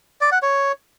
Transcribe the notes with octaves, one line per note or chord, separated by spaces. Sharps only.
D5
F#5
C#5